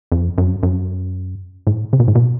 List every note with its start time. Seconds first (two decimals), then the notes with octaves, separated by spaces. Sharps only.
0.12 F2
0.38 F#2
0.63 F#2
1.67 A2
1.93 C#3
2.00 B2
2.08 A2
2.15 B2